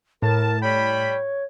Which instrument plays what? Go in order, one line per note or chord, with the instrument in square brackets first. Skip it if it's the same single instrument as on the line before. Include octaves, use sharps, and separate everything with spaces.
[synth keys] A2 [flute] A#4 [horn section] A5
[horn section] G3 G5 B5 [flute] C#5